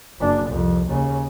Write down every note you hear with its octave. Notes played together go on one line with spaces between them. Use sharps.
F#1 D4
C2 F2
D#2 C#3